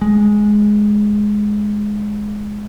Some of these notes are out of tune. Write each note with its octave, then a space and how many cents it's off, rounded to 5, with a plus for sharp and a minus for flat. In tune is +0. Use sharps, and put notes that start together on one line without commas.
G#3 +5